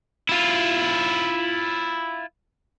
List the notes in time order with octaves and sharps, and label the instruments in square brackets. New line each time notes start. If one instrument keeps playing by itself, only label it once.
[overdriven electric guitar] E4 F4